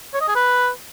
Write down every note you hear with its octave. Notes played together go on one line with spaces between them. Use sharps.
C#5
D#5
G#4
B4